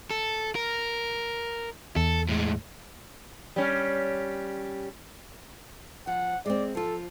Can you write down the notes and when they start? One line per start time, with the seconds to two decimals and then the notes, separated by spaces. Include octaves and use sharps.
0.11 A4
0.55 A#4
1.96 E2 A4
2.29 A2 G#3
3.56 G3 C#4
6.07 F3 F#5
6.46 G#3 C4 D5
6.75 F3 F4 A4